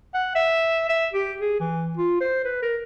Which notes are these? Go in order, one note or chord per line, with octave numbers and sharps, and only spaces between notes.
F#5
E5
E5
G4
G#4
E3
F4
C5
B4
A#4